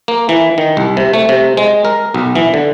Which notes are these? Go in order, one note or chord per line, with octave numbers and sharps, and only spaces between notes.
A#3
E3
D#3
C2
C3
A3
C3
G#3
A#4
B1
E3
D3